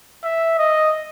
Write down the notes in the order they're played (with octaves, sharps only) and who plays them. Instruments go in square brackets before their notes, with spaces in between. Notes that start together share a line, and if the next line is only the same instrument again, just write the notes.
[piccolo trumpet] E5
D#5